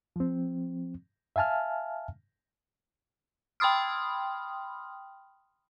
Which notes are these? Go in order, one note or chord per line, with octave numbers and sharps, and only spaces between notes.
F3 C4
E5 F5 G#5 A5 F6
G5 B5 C6 D#6 F6